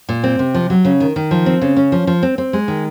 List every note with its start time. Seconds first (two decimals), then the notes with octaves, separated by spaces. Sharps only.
0.09 A#2
0.24 C4
0.39 C3
0.54 F3
0.70 F#3
0.85 C#3
1.00 D#3
1.16 D#3
1.31 F3
1.46 C4
1.61 C#3
1.76 C#4
1.92 F3
2.07 F3
2.23 C4
2.38 C4
2.53 G#3
2.68 D#3